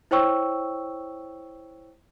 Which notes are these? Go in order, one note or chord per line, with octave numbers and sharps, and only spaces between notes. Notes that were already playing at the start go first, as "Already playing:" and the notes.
E4 C5 C#5 G5 C#6 E6